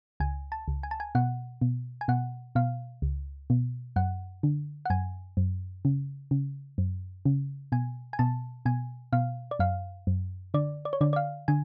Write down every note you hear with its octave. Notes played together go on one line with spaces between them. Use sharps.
C#2 G#5
A5
C#2
G#5
A5
G#5
B2 F#5
B2
G#5
B2 F#5
B2 F5
C#2
B2
F#2 F#5
D3
F#5
F#2 G#5
F#2
C#3
C#3
F#2
C#3
B2 G#5
G#5
B2 A5
B2 G#5
B2 F5
D5
F#2 F5
F#2
D3 D5
D5
C#5
D3 D5
D5
F5
D3 G#5